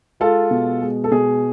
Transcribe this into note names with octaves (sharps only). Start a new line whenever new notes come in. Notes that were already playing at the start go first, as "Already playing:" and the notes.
G#3 F4 A4
B2
G#3
A4
B2 G#4